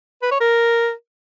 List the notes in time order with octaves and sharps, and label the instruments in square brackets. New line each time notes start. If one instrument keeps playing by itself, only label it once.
[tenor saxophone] B4
C#5
A#4